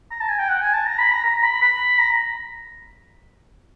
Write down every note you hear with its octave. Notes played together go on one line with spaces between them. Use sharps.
A#5
A5
G#5
G5
F#5
G#5
A5
A#5
B5
A#5
A#5
B5
B5
A#5